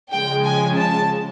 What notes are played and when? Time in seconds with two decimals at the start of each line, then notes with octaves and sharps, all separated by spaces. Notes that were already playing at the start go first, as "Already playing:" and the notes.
0.11 C#3 F3 G#3 G5
0.43 G#5
0.75 A5